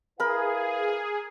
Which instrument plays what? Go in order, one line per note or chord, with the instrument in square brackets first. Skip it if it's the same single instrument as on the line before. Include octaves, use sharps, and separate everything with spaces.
[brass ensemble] E4 B4 F5 [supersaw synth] G#4 [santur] A#4 B5